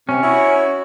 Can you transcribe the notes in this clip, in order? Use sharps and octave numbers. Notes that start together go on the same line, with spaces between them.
C3 C#4
E4 F#4 C#5